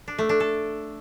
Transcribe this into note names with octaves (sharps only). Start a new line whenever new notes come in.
D4
A3
D4
A4